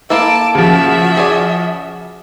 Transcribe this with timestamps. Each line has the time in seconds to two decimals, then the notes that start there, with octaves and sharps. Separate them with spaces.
0.10 A#3 E4 A4 A5 D6
0.55 C#3 F3 F#4 E5
1.17 G#4 D5